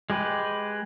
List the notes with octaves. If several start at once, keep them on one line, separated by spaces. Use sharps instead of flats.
G#3 G4 B4